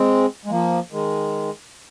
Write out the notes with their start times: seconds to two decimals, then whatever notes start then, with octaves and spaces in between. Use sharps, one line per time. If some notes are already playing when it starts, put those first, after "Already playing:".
Already playing: G#3 C4
0.45 G#3
0.50 F3 A#3
0.92 D#3 G#3